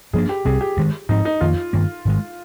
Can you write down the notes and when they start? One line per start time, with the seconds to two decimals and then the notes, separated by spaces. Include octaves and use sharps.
0.13 G2 F3 A#3 D4 G#4
0.29 G4
0.45 C2 C3 G3 C4 G#4
0.61 G4
0.77 G2 D#3 G#3
1.09 G#2 F3 C4 D#4
1.25 D#4
1.41 F2 D#3 A#3 F4
1.73 G2 D#3 A#3
2.05 G#2 D#3 G#3